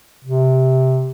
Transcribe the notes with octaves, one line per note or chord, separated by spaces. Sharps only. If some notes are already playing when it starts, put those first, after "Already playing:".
C3